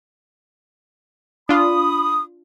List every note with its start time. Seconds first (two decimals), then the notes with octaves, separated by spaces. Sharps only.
1.49 D4 F4 B5 D#6